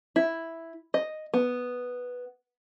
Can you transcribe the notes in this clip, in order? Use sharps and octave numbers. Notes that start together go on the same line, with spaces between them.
E4
D#5
B3